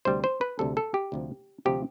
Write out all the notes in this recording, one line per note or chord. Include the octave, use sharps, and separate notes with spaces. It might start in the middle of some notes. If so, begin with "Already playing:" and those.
D2 C3 G3 C5
C5
B4
D2 C3 G3 A4
A4
G4
D2 C3 F3
D2 C3 F3 G4